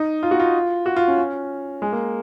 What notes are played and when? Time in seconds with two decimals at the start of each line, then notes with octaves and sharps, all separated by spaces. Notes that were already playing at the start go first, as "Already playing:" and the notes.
Already playing: D#4
0.23 F4
0.31 F#4
0.40 F4
0.86 F#4
0.96 F4
1.08 C#4
1.18 C#4
1.82 G#3
1.92 A#3